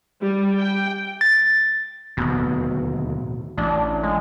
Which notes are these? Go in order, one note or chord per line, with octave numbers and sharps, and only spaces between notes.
G3
G5
A6
D1 D#2 B2
A1 D4
G#3